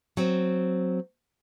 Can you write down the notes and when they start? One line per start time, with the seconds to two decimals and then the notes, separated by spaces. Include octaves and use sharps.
0.17 F#3 C4